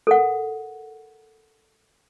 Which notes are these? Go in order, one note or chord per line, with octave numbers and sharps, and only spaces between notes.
A4 A#4 F#5